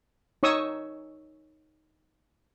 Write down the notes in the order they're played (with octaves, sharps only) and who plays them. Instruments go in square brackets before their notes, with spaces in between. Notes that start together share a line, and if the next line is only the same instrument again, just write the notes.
[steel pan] D#4 C#5 C#6 D#6 E6